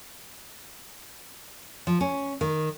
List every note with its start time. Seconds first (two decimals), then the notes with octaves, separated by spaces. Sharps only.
1.87 F3
2.01 C#4
2.41 D#3